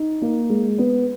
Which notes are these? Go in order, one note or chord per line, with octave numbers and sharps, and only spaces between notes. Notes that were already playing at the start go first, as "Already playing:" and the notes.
Already playing: D#4
A#3
G#3
B3